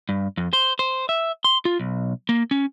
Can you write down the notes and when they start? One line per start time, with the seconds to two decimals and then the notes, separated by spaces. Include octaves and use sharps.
0.09 G2
0.37 F2
0.53 C5
0.79 C5
1.09 E5
1.44 C6
1.65 F4
1.80 B1
2.29 A#3
2.51 C#4